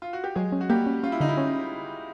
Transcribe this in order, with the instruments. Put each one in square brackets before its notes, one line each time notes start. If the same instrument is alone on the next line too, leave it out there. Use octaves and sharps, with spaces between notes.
[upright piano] F4
F#4
G4
[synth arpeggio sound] F#3 [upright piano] G#3 G#4
[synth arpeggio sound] C#4
[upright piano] F#4
[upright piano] G3 G4 [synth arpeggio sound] A#3
[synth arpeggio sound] C#4
[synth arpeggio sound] C#4 [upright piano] F4
[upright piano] E4
[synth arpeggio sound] D3 [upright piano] D#4
[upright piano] E4
[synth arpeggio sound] C#4